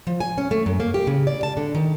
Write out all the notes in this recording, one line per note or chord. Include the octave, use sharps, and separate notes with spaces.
F3
G#5
C#4
A3
F#2
A#3
G4
C#3
D5
A5
D3
D#3